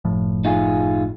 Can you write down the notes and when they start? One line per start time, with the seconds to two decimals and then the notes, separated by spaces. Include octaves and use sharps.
0.05 F#1 A2 F3
0.45 D#4 F4 G#4